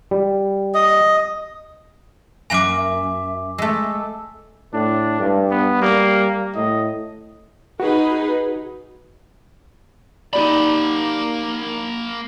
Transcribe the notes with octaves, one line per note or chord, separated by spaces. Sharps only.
G3
D#5
F#2 A#3 G#5 A#5 D6
E5
G#3 A3 E6
A2 D4
G2
B3
G3 A#3
A2 D#5
D#4 F#4 G#4 B4
A#3 D#4 G4 D5 B5